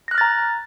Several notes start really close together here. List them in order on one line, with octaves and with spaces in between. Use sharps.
A#6 F#6 F6 A6 A#5